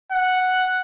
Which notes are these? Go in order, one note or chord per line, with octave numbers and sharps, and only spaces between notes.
F#5